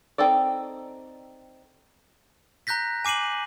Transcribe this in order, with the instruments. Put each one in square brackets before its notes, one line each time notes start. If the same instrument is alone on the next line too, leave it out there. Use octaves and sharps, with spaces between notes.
[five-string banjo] C4 D#4 A4 D5
[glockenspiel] A#5 F#6 G6 A#6 B6
G#5 D6 C7 D#7 F#7